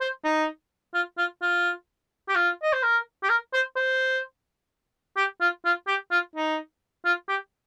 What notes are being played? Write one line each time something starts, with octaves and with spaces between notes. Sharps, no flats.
C5
D#4
F4
F4
F4
G4
F4
D#5
C5
A#4
G4
A#4
C5
C5
G4
F4
F4
G4
F4
D#4
F4
G4